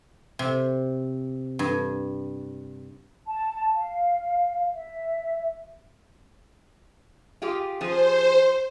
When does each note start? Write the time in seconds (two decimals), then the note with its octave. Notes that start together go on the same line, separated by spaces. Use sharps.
0.39 C3
1.59 G2
3.27 A5
3.74 F5
4.74 E5
7.42 F4 G4 G#4
7.81 F3 G#4 C5